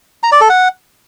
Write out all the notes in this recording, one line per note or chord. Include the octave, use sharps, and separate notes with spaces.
A#5
D5
A4
F#5